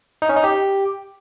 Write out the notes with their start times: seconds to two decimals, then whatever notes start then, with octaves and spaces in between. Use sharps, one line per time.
0.22 D#4
0.29 C#4
0.37 D#4
0.44 G4